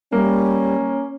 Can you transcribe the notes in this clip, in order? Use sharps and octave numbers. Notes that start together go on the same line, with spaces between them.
G3 A#3 C#4